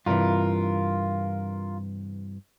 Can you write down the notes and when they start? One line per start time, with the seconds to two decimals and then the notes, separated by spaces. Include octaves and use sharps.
0.06 G2 C3 E3 F4 A#4